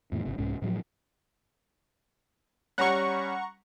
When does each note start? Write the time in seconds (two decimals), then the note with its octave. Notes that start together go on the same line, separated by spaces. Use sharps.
0.12 F2 A2 E3
0.25 G1 C3
0.38 C2 G#2 C#4
0.62 A2 F3 F#3
2.78 G3 C#4 F#5 A#5 C#6